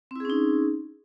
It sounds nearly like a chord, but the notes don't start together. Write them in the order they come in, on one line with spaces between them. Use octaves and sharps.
C4 E4 G#4 C#4 D#4